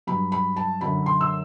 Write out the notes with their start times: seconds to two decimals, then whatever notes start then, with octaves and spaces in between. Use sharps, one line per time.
0.07 G2 F#3 B5
0.32 B5
0.56 A5
0.81 F#2 D3 F#3 B5
1.06 C6
1.21 E6